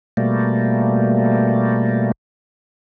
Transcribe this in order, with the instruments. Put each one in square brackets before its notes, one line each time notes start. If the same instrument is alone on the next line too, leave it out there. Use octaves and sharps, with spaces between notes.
[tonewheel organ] B2 G3 A3 A#3